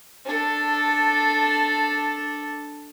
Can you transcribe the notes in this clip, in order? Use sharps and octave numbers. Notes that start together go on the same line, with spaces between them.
D4 A4